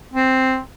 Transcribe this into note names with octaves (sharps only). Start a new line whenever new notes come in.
C4